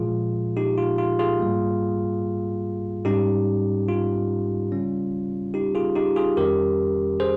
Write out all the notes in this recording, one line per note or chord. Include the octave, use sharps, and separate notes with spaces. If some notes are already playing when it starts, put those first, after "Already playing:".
Already playing: A#2 F3 G#3 F4 G#4
D#4 G4
F4
F4
F4 G#4
G#2 G3 A#3
G#2 G3 C#4 D#4 G4
F4
C#3 G3 C#4
D#4 G4
F4 G#4
D#4 G4
F4 G#4
F2 D#3 G3 C#4 G4 A#4
G#4 C5